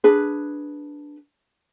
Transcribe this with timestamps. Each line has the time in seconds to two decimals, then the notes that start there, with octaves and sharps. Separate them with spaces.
0.04 D4 G#4 B4